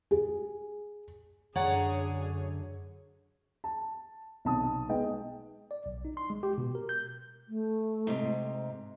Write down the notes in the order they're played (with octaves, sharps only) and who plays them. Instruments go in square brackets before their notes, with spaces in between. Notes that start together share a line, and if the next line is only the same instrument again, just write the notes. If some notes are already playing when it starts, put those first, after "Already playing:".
[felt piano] G#4
[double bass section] F#2 D3 [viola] G#4 [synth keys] C#5 [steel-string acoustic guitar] D5 F#5 A#5
[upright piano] A5
B1 C3 A5 D#6
G#3 B3 D#4 G5
[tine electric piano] D5
B1
D#4
C6
G#3
G4
B2
A#4
G6
[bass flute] A3
[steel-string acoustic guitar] G#2 C3